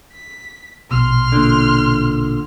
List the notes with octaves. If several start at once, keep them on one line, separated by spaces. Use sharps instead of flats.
B6
A#1 B2 C6 F6
A#2 D3